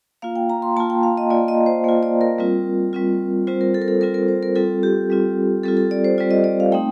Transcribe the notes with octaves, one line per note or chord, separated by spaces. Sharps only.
A#3 F4 F5
G5
A#5
C6
A#3 F4 A5
G5
F5
D#5
A#3 F4 D5
D#5
C5
A#3 F4
D5
A#4
G3 C4 F4
G3 C4 F4
G3 C4 F4 C5
A#4
A4
A#4
A4
G3 C4 F4 A#4
A#4
C5
A#4
G3 C4 F4 A4
G4
G3 C4 F4
G3 C4 F4 A4
A4
D5
C5
G3 C4 F4 D5
D#5
D5
F5
A3 C4 D#4 G5